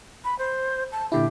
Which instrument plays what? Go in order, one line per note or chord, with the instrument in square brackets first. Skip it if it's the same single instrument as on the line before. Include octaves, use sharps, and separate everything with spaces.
[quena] B5
C5
A5
[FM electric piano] A#2 D3 E4 [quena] G4